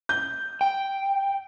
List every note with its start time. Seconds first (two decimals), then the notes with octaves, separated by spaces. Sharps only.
0.09 G6
0.61 G5